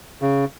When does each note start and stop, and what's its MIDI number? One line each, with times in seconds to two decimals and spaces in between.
0.22 0.45 49